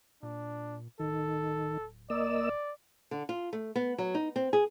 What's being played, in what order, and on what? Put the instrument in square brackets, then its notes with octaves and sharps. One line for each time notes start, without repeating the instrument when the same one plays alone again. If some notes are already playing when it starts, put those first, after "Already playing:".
[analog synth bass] A#2 [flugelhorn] D4
[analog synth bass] D1 [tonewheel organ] D#3 [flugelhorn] A4
[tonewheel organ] A#3 D#5 E6 [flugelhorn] D5
[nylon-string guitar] D3
F4
A3
B3
F#3
D#4
C4
G#4